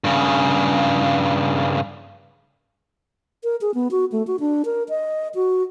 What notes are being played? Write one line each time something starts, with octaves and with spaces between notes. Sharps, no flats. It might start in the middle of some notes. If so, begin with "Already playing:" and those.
G2 C#3
A#4
G#4
B3
F#4
A3
F#4
D4
A#4
D#5
F#4